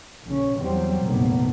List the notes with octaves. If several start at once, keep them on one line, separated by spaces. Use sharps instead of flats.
A#1 C#3 C#4
E2 F#3 G3 C4
F1 A#1 G2 D3 A#3 B3